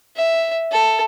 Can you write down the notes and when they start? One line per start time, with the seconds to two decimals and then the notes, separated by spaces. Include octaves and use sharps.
0.16 E5
0.71 A4